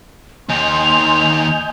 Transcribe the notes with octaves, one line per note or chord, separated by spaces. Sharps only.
D#2 D#3 D#5 G#5 C6 G6 F7